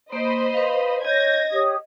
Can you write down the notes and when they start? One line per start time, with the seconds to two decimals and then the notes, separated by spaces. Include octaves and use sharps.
0.12 A#3 C5 D#5 B5
0.54 B4 F5
1.05 C#5 D#5 G6 G#6 A#6
1.52 G4 C#5 D#6